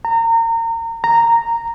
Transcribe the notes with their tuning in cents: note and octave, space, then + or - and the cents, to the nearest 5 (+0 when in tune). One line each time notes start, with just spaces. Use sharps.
A#5 -30
A#5 -10